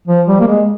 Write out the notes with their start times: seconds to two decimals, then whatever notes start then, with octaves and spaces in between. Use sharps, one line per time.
0.08 F3
0.28 G3
0.40 A#3
0.48 G#3